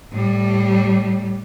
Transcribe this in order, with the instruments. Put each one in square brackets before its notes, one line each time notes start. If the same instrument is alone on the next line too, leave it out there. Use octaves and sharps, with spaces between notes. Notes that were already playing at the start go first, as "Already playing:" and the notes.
[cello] A2 G3